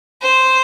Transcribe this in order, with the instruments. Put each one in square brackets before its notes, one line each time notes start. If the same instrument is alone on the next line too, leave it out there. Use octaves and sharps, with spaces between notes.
[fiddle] C5